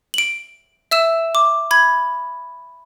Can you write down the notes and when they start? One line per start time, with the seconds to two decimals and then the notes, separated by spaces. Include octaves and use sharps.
0.14 D7 F#7
0.91 E5 E6 E7
1.35 D6
1.71 B5 G#6